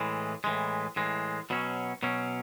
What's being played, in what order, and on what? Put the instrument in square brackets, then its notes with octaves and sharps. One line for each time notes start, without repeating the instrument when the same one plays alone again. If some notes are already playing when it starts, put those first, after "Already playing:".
Already playing: [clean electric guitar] A2 E3 G#3
A2 E3 G#3
A2 E3 G#3
B2 F#3 C#4
B2 F#3 C#4